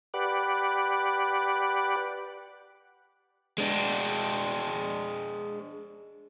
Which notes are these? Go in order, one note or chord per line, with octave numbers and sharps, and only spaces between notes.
G4 B4 D5 F#5
G#3 D4